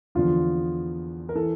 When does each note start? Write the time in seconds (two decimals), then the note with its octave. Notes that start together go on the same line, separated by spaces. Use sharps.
0.15 E2 D3 F3 F4
1.29 A#4
1.35 E3 A4